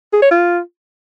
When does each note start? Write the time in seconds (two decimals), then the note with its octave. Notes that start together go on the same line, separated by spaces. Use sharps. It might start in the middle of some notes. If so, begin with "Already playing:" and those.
0.13 G#4
0.22 C#5
0.31 F4